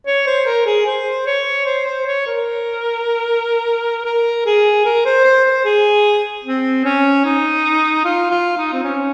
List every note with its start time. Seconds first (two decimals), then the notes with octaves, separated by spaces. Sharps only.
0.07 C#5
0.27 C5
0.46 A#4
0.66 G#4
0.87 C5
1.26 C#5
1.66 C5
1.86 C5
2.07 C#5
2.27 A#4
4.06 A#4
4.46 G#4
4.85 A#4
5.05 C5
5.24 C5
5.45 C5
5.65 G#4
6.44 C4
6.85 C#4
7.25 D#4
8.05 F4
8.31 F4
8.57 D#4
8.73 C4
8.84 C#4